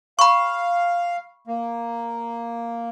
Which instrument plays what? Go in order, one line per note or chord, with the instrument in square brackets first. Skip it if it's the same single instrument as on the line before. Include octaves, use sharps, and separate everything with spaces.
[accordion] F5 [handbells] B5 C#6
[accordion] A#3